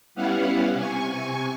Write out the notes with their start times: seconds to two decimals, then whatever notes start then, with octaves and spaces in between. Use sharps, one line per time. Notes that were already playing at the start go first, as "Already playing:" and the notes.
0.15 G3 B3 C#4 E4 F5 F#5
0.74 C3 G#5 C#6